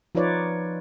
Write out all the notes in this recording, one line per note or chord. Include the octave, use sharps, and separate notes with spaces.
F3 D#4 F4 B4 C#5 D5